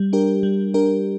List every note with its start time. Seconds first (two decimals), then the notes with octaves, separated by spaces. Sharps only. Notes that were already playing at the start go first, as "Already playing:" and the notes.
Already playing: G3
0.13 D4 G4 A#4
0.43 G3
0.74 D4 G4 A#4